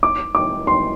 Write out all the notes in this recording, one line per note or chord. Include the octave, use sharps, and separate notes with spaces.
D6
D6
C6